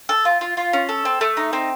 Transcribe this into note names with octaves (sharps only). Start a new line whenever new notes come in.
A4
F4
F4
F4
C#4
A4
C4
A3
D#4
C4